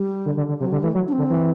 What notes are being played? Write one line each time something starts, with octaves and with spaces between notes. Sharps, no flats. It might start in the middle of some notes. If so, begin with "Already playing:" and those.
Already playing: G3
D3
D3
D3
C3 F#3
D3 G3
E3 A3
F#3
D4
C4
D3
E3